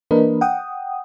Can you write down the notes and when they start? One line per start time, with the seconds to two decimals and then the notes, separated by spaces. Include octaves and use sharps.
0.11 E3 A#3 D4 A#4 B4 D#5
0.41 F#5 G5 D#6